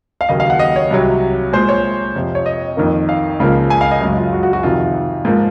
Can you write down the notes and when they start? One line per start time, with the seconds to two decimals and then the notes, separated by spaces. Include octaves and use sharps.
0.21 F5
0.29 D#2 C#3 F#3 A#3 D#5
0.40 F5
0.50 F#5
0.59 D#5
0.76 C#5
0.91 C2 C3 F#3
1.53 A#2 G#3 C5
1.69 C#5
2.16 F2 C3 F3
2.35 C#5
2.46 D#5
2.77 F2 D#3 A#3
3.09 F5
3.40 C#2 C#3 F3 A#3
3.70 G#5
3.81 F5
3.91 D#5
4.01 F#2 C#3 G#3
4.17 F4
4.33 F#4
4.43 F#4
4.53 F#4
4.63 F2 C3 D#3 F4
5.25 G#2 F3 A#3